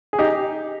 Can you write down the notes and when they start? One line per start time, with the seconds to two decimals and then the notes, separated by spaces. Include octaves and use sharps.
0.13 G#4
0.19 D#4 G4